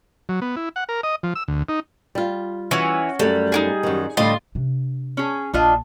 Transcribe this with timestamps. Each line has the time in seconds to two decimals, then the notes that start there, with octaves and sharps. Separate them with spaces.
0.29 F#3
0.42 B3
0.56 E4
0.76 F#5
0.89 A#4
1.03 D#5
1.23 F3
1.35 E6
1.48 D2
1.69 D#4
2.15 G3 F4
2.71 E3 C#4 F#4
3.19 F#2 G3 A3
3.52 D#4 E4 G#4
3.83 F#2 D#3
4.17 A2 D3 G3 F4 D#5 C6
4.55 C3 D4
5.17 C#4 G#4
5.54 A#1 D4 F4 D#5